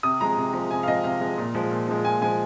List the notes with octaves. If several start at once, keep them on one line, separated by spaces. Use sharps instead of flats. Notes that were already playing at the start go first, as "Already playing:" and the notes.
C3 D#6
F3 G#3 A#5
C3
F3 G#3
C3 G#5
F5
F3 G#3 D#5
C3 F5
F3 G#3
A#2
F3 G#3
A#2
F3 G#3
A#2 G#5
F3 G#3 G#5